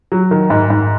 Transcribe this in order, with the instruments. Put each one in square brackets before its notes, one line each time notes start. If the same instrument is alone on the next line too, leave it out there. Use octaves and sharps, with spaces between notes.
[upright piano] F#3
D#3
G#2
G#2